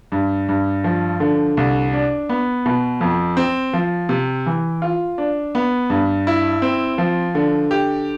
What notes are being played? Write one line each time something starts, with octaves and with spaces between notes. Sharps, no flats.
G2
G2
F3
D3
C2
D4
B3
B2
F2
C4
F3
C3
E3
F4
D4
B3
G2
E4
C4
F3
D3
G4